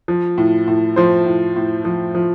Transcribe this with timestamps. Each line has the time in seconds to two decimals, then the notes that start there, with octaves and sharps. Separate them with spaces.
0.08 F3
0.38 A2
0.68 A2
0.96 F3 C5
1.26 A2
1.56 A2
1.85 F3
2.15 F3